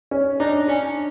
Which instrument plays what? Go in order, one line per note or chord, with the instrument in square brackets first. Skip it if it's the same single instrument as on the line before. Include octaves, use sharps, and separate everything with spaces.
[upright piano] C#4
[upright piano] D4 [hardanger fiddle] D#4
[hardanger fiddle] C#4 [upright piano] D4